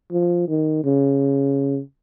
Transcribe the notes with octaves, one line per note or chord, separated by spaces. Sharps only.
F3
D#3
C#3